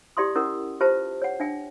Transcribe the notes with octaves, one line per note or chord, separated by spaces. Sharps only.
E4 G4 D5 E5 C6 D#6
C#4 E4 A#4 F#5 D#6
F4 G4 B4 C5 E5 A5
C#5 F#5
D4 E5 G5